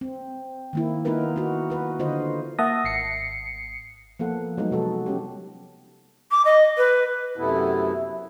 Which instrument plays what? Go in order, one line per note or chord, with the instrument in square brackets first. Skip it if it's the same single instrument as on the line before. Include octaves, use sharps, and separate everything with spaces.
[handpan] C4
D#3 A#3 E4
A#3 B3 D#4 F4 A#4 B4
B3 F#4
F#4 B4
D3 F4 C5 D#5
[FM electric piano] A#3 E5 F#5 A5 D#6 A#6
G#1 C7 C#7
[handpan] F3 A#3 B3 A4 F#5
F#3 G#3 B3 D#4
C3 F#4 A4
G3 C#4 G4
[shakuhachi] D6
D#5
B4
[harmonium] F#2 C3 A3 B3 E4